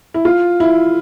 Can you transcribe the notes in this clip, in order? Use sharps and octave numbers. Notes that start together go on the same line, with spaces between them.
E4
F4
E4